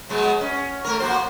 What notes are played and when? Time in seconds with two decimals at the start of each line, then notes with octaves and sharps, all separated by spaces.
0.09 F#3 G#3 B3
0.41 C#4
0.85 A3 A#4
1.00 A#3 F#4 C5